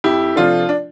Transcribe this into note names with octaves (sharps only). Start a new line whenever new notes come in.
F2 E4 G4
C3 F3 A3 D4 F4
D4